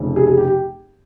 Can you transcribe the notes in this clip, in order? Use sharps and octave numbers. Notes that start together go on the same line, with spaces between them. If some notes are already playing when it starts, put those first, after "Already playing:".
Already playing: F1 F2 C#3
G#4
G#4
G4
G4